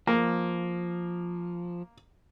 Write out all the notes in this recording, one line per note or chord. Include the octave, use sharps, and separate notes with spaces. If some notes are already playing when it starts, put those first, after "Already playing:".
F3 A#3